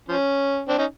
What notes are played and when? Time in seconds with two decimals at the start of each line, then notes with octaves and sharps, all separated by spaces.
0.08 F3 C#4
0.68 C4 D4
0.78 C#4 D#4